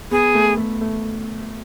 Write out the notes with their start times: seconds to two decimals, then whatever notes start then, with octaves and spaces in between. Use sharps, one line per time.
0.11 B3 G#4
0.35 A3
0.57 A3
0.81 A3